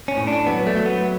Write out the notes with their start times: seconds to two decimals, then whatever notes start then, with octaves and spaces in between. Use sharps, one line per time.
0.08 C#4
0.17 A2
0.27 D4
0.46 F#3 B3
0.67 A3
0.76 F#3
0.86 B3